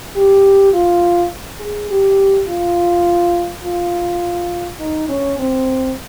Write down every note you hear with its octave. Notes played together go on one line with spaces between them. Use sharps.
G4
F4
G#4
G4
F4
F4
D#4
C#4
C4